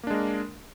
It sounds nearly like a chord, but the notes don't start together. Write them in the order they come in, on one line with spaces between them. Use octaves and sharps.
A#3 D4 G#3 A#4